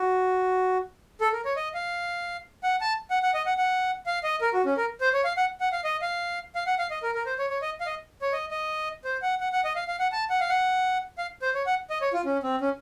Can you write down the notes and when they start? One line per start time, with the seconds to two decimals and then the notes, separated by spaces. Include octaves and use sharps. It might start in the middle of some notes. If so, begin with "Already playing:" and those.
Already playing: F#4
1.21 A4
1.33 A#4
1.45 C#5
1.56 D#5
1.74 F5
2.63 F#5
2.81 A5
3.11 F#5
3.23 F#5
3.34 D#5
3.46 F#5
3.58 F#5
4.06 F5
4.24 D#5
4.41 A#4
4.54 F#4
4.65 C#4
4.77 A#4
5.01 C5
5.13 C#5
5.24 F5
5.37 F#5
5.60 F#5
5.72 F5
5.84 D#5
6.02 F5
6.55 F5
6.67 F#5
6.79 F5
6.91 D#5
7.03 A#4
7.15 A#4
7.26 C5
7.39 C#5
7.50 C#5
7.62 D#5
7.80 F5
7.86 D#5
8.22 C#5
8.33 D#5
8.51 D#5
9.05 C5
9.22 F#5
9.41 F#5
9.53 F#5
9.65 D#5
9.76 F5
9.88 F5
9.99 F#5
10.12 A5
10.30 F#5
10.40 F5
10.50 F#5
11.18 F5
11.42 C5
11.54 C#5
11.66 F#5
11.90 D#5
12.01 C#5
12.13 F4
12.25 C#4
12.43 C4
12.61 C#4